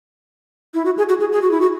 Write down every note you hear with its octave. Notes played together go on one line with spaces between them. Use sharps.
E4
F#4
G#4
F#4
G#4
G#4
F#4
E4
F#4